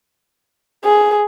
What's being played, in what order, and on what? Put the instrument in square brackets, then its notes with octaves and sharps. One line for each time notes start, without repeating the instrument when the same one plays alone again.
[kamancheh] G#4